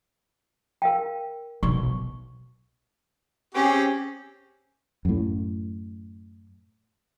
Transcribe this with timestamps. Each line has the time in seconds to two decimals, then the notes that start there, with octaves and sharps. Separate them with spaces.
0.82 A#4 F5 G5
1.63 B1 C#6
3.55 C4 C#4 G4 G#4
5.05 F#2 A2